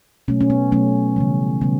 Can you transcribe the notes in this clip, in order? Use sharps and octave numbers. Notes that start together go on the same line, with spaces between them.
B2 F#3 A3 C#4
C#4
B3
B2 F#3 A3 C#4
C#3 E3 G3
C#3 E3 G3 B3